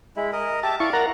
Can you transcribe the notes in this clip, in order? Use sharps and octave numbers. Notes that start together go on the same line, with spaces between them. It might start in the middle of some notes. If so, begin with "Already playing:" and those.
G#3 E4
A#4 D#5
G4 E5 A5
E4 D5 F5 C#6
A#4 F#5 A#5